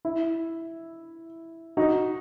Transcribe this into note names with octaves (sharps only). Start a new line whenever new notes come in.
E4
D#4 F#4